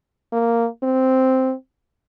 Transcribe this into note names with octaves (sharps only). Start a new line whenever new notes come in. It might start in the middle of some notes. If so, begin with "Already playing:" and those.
A#3
C4